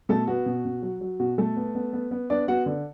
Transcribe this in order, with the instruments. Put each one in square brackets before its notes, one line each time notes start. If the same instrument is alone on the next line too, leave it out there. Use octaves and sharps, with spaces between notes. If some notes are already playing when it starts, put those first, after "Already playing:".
[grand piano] B2 A3 A4
B3 F#4
B2
B2
F#3
F#3
B2 F#4
B2 A3 A4
B3
B3
B3
B3
B3 D4 D5
B3 F#4 F#5
D3